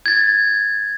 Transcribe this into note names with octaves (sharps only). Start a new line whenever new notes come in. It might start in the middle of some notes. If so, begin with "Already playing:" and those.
G#6 A6